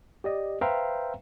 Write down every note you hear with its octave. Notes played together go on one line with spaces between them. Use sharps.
G4 D5 D#5
B4 C5 E5 F5 G5 A#5